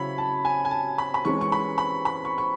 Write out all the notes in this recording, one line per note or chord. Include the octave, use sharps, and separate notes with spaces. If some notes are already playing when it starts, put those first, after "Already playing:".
Already playing: C#3 F#3 C#4 E4 C#5 B5
A5
G#5
G#5
A5
B5
B5
E3 G#3 C#4 C#6
C#6
B5
B5
B5
C#6
C#6